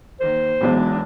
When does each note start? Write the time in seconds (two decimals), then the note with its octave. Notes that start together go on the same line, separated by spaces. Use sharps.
0.20 D#3 A#3 C5
0.61 E1 B1 E2 G#3 D4